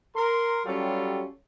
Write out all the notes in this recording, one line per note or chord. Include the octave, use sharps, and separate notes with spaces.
A#4 C6
F#3 G3 C#4 F4 G4 A4